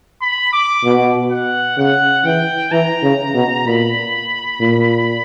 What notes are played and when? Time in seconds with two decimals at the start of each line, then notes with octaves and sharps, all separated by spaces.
0.21 B5
0.53 D6
0.84 B2
1.31 F#5
1.78 C#3 F#5
2.25 E3 G5
2.71 E3 A#5
3.03 C#3
3.34 B2
3.65 A#2 B5
4.60 A#2